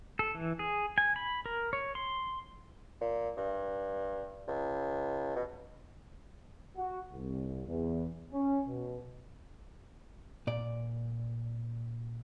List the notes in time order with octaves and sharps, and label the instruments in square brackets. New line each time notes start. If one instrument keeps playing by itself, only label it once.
[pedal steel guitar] A4
E3
G#4
G#5
B5
A#4
C#5
C6
[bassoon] A#2
G2
C#2
B2
[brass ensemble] F#4
C2
E2
C#4
B2
[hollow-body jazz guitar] A#2 D5